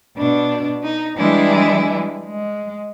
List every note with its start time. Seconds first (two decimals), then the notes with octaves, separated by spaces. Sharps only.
0.17 B2 D4
0.83 D#4
1.18 E3 G3 G#3 D4 E4 G#4
2.24 G#3